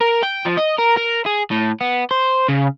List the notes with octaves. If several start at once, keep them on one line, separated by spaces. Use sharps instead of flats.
A#4
G5
F3
D#5
A#4
A#4
G#4
A2
B3
C5
C#3